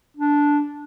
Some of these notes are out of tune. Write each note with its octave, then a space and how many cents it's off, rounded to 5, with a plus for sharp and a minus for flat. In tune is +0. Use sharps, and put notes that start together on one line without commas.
D4 -10